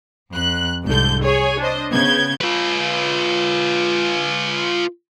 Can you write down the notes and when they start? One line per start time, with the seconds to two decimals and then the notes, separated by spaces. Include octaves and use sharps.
0.34 F2 F#6
0.85 C2 G#2 D3 G6
1.22 G#4 C#5 G#5
1.59 D4 C5 D#5
1.92 C#3 B3 G6 G#6
2.41 F4 B4